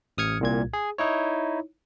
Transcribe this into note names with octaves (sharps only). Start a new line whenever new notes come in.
A1 D#6 F6 G#6 C#7
C2 A#2 G#6
G#4
D#4 E4 C#5